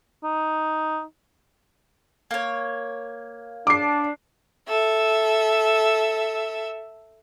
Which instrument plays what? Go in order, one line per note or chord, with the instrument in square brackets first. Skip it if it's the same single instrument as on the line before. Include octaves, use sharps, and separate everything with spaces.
[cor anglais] D#4
[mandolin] A#3 C#5
[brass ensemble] D4 [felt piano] D6 C7
[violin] A4 E5